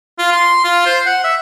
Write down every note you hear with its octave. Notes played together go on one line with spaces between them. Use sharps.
F4
C6
F4
C5
F#5
E5